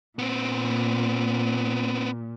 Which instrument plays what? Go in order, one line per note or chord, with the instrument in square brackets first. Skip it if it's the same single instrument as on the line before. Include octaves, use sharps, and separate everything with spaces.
[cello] A#2 [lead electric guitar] B3 C4